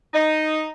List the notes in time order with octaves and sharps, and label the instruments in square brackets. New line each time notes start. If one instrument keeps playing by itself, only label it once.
[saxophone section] D#4